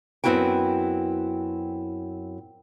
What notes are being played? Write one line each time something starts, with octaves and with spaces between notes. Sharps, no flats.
F#2 B3 C4 E4 F#4 G5